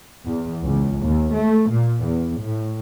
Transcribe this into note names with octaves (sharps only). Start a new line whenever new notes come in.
E2
C#2
D#2
A3
A#2
E2
A2